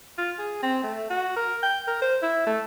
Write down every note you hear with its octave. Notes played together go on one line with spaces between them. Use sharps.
F4
G#4
C4
A3
F#4
A#4
G5
A#4
C5
E4
A3